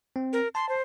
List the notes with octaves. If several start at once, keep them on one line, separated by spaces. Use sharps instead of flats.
C4
A#4
A5 C6
C5